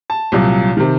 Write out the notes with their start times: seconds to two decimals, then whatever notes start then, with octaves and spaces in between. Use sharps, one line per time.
0.10 A5
0.32 C2 A#2 F#3
0.77 C3 D#3